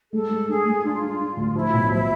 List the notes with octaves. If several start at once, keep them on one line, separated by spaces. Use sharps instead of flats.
G#3 A4
G#3
D4 G#4
G#3
D4 F4
D4
D4
D2
F3 E4
B1
F3 E4